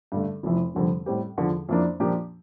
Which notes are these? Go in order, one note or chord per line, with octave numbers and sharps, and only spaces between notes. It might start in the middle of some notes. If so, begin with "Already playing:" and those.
G2 D3 A3
F1 F2 E3
F1 F2 D3 G3 C4
A2 G3 C4 G4
E2 D3 F3
F2 E3 A#3 D4
A#2 F3 A#3 D4 G4